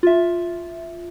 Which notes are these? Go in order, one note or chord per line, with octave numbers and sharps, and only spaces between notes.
F4 E5